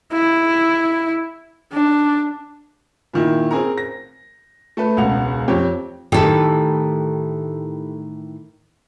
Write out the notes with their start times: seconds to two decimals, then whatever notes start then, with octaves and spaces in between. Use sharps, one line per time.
0.12 E4
1.72 D4
3.13 A#2 D#3 E4
3.51 C4 G#4 A#4 A#5
3.78 A#6
4.77 A3 A4 B4
4.97 E1 C#2 F#5 F7
5.48 F2 C4 G4 C#5 G5
6.12 A2 D#3 E3 G4 A4